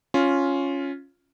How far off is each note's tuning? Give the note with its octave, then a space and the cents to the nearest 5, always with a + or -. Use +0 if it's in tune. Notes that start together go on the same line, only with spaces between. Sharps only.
C#4 +0 F4 +0